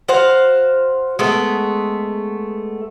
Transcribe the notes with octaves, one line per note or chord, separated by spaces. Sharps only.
F#4 C5 F5
G#3 A3 B3